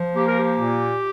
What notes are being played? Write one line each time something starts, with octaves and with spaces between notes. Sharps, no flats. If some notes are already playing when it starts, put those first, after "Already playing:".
Already playing: F3
A#3 G4
A#4
G4
A#2